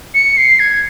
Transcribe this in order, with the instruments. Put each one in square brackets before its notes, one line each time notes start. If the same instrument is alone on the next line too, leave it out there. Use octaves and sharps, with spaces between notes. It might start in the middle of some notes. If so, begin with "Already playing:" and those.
[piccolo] C#7
C7
G#6